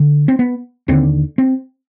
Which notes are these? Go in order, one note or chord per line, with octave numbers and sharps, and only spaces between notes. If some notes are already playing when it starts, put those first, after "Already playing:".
Already playing: D3
C4
B3
D#2 D3 C4
C4